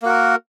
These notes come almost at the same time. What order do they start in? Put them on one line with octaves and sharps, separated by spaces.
A#3 F#4 A#4